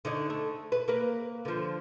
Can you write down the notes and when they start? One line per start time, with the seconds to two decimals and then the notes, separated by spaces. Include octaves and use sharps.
0.05 D3 D#4 C#5
0.30 A3
0.72 B4
0.88 A#3 A#4 B4
1.45 D3 F3